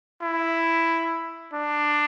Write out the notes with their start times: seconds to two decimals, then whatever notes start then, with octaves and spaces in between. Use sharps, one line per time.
0.22 E4
1.53 D4